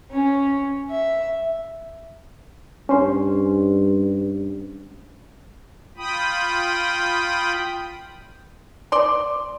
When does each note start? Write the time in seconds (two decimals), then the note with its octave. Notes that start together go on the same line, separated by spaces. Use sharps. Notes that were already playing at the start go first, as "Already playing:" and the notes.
0.11 C#4
0.90 E5
2.89 G2 C#4 C5 C6
5.97 F4 G5 B5 D#6
8.92 D5 C6